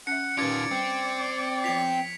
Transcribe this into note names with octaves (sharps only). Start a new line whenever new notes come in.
C#4 E5 F#5 C#7
D#3 C#4 F4 G4 B4 D5 G#6 D7
G3 C4
F3 B3 F4 B6 F7